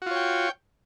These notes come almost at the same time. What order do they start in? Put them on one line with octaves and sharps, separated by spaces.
F#4 F4 C#5 G5